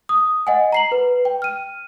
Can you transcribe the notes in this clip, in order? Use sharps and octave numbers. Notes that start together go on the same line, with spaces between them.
D#6
D#5 F#5 G#5
A#5 C7 F#7
B4
G5
F6 D#7